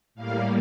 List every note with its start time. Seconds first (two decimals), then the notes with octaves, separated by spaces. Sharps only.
0.15 A2 G3 A#3 F5